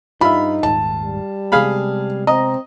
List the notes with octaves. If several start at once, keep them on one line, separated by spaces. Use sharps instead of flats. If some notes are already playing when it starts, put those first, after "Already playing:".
G2 D#4 F4 E5 B5
D#1 G#2 D#3 A5
G3
C3 G#3 B3 G#4 F5 B5
C4 D#5 A#5